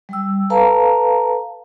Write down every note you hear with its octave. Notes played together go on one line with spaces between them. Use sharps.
G3 G5 E6
A4 B4 F5 A5 A#5